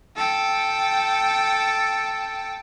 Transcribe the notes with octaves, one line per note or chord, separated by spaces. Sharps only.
A4 G5